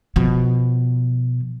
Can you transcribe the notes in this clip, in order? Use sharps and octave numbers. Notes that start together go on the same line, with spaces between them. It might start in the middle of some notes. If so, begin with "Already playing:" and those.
B2 F3